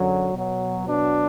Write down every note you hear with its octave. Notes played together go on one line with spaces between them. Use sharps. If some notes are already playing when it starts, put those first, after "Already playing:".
Already playing: F#2 D3 F#3
B2
F#3
B2 F#3 D4